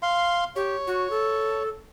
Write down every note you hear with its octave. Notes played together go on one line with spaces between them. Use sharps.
F5 C6
G4 C#5
F#4
A4